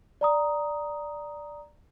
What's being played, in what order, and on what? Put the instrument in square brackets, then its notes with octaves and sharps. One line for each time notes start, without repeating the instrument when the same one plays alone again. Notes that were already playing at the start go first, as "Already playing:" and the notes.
[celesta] D5 A#5 D#6